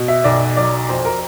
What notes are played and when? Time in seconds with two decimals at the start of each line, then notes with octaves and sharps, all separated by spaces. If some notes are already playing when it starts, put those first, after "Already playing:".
Already playing: B2
0.08 E5
0.24 B1 D5
0.57 F#3 D5
0.89 F2 C5
1.05 A#4